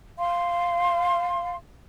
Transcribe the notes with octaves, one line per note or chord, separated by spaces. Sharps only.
F5 C6